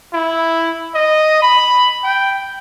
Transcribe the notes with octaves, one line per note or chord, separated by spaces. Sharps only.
E4
D#5
B5
G5